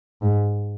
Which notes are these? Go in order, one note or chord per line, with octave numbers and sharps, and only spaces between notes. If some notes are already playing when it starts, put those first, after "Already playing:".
G#2